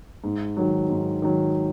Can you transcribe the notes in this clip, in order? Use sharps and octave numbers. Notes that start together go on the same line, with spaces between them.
G#2
D#3 F#3
G#2
D#3 F#3